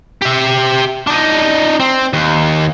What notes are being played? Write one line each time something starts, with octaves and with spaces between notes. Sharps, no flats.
G4 E5
D4 D#4
C4
D#2